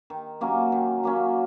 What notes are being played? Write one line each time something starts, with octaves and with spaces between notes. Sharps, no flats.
D#3
F#3 A#3 C#4
D#3
F#3 A#3 C#4